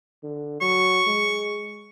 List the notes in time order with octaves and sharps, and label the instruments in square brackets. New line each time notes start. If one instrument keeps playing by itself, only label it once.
[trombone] D3
[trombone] F#3 [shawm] C#6
[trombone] G#3